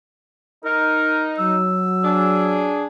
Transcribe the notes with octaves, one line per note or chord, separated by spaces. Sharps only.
D#4 A#4
F#3 E6
D4 G#4